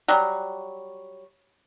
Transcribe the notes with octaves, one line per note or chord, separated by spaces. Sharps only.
F#3 G3